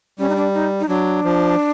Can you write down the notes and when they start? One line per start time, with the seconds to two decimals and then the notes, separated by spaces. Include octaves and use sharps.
0.19 G3 C#4
0.29 D#4
0.36 D4
0.54 D#4
0.80 D#4
0.89 F#3 D4
1.24 F3